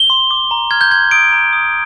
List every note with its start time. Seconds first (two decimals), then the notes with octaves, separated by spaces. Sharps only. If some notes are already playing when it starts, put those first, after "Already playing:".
Already playing: G7
0.10 C6
0.31 D6
0.51 A#5
0.71 F6 G#6
0.81 G6
0.91 C6 G#6
1.11 D#6 D7
1.32 A#5
1.53 D#6